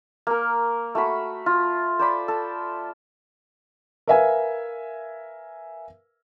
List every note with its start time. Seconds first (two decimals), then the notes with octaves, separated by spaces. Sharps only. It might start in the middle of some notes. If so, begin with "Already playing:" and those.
0.27 A#3 A#4
0.95 A3 F#4 B5
1.46 F4
1.99 C5 D5 B5
2.28 A4
4.07 A#4 B4 E5 F5 G#5